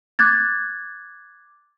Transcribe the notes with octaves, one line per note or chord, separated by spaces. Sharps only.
D6 F#6 G#6 A6